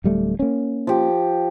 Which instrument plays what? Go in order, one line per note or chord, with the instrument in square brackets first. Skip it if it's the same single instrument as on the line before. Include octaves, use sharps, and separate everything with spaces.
[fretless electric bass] D1 G3 A3
A#3 C#4
[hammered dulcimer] F3 G4